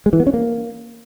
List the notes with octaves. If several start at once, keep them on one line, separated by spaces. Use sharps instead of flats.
G#3
E3
B3
C#4
A#3